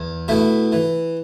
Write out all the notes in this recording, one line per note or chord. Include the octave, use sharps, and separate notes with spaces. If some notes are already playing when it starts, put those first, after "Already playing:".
Already playing: E2
B2 A3 E4
E3